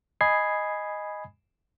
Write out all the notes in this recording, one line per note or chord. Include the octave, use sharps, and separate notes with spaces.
D#5 G#5 B5 D#6 G#6 C7